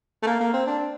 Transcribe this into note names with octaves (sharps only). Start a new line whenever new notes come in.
A3
A#3
A#3
C4
D4